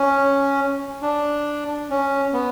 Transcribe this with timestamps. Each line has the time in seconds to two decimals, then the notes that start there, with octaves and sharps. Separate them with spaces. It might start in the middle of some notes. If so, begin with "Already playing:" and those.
Already playing: C#4
1.02 D4
1.90 C#4
2.33 B3